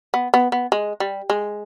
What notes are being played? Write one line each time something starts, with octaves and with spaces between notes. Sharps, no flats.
B3
B3
B3
G#3
G3
G#3